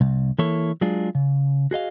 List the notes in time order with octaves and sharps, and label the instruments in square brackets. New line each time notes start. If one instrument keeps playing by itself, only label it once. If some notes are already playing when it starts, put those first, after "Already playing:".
[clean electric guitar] C2
E3 A#3 E4 A4 C#5
F#3 G#3 D4 F4 G#4
C#3
F#4 G#4 D#5 F5